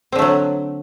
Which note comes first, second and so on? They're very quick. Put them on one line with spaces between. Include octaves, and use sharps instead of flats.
C4 D3 A3 F#3